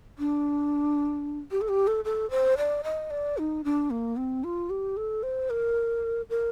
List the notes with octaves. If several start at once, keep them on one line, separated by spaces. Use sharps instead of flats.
D4
G4
A4
G4
A4
A4
C5
D5
D#5
D5
D#4
D4
A#3
C4
F4
G4
A4
C5
A#4
A#4